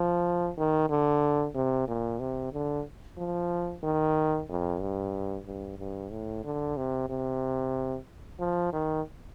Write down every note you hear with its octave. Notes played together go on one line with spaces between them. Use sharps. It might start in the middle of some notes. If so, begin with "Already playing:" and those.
Already playing: F3
D#3
D3
C3
A#2
C3
D3
F3
D#3
F2
G2
G2
G2
A2
D3
C3
C3
F3
D#3